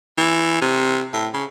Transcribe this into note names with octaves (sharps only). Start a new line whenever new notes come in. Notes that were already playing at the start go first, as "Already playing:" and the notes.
E3
C3
A2
C#3